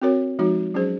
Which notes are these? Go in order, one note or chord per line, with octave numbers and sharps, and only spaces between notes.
C4 F#4 A#4 C#5
F3 G#3 D#4 F#4
F#3 C#4 G#4 C5